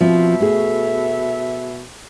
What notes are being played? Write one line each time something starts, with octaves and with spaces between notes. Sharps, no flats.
B2 F3 C4 E5
A3 G#4